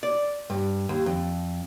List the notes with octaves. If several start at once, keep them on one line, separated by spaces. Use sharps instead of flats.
D5
G2
D#2
F2